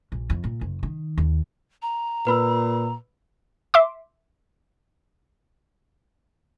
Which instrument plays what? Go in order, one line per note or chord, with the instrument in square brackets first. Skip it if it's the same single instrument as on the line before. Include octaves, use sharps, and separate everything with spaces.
[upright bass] A#1
F2
A#2
F#1
D#3
D#2
[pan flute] A#5
[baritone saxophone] A#2 [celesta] B4 B5 E6
[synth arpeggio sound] E5 C6 D6